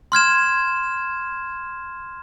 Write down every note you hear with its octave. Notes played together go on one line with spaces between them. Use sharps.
C6 F6 G#6 E7